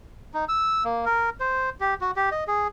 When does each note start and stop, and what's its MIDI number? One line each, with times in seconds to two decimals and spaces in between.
0.34 0.45 63
0.49 0.84 88
0.84 1.05 58
1.05 1.30 70
1.40 1.70 72
1.81 1.94 67
2.01 2.11 66
2.16 2.29 67
2.32 2.44 75
2.47 2.68 68